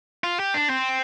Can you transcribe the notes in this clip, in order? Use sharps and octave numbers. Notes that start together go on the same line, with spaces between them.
F4
G4
D4
C4